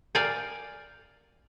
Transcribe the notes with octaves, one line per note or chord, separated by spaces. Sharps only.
A#4 D5 F5 G5 G#5